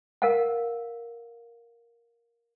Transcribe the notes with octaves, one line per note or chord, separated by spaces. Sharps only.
A#4 F5 F#5